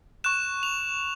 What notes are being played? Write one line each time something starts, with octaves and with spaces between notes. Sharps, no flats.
C#6 F#6 E7
F7